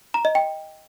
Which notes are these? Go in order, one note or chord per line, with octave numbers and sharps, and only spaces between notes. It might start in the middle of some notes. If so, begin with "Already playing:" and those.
A#5
D#5
G5